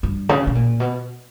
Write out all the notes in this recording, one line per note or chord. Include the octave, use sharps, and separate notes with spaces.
G2
C#3
B2
A#2
B2